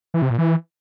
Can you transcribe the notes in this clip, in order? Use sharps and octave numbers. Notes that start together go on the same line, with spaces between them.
E3
C3
A#2
E3